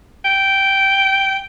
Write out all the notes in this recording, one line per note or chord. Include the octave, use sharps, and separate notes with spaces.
G5